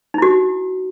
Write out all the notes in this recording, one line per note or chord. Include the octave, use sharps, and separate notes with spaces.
D#4 E4 F#4